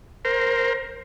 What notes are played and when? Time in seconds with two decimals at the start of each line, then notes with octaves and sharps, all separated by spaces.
0.25 A#4 C5